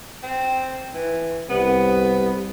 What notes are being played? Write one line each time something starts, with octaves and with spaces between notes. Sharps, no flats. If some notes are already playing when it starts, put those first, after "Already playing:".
C4
E3
C2 B3